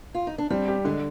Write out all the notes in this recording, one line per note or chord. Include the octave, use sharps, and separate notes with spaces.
F4
D#4
D4
G3 C4
G4
D3 G#3